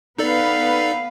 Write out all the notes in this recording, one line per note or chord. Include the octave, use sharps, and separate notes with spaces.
B3 D#4 A4 B4 D5 F5